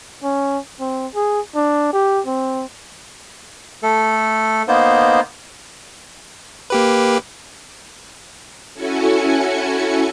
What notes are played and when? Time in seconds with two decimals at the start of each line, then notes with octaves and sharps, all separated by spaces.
0.23 C#4
0.80 C4
1.15 G#4
1.56 D4
1.93 G4
2.26 C4
3.83 A3 A4
4.68 A#3 B3 D#4 C5
6.70 A#3 G4 B4
8.73 C#4 E4 F#4 A4 G#5 C#7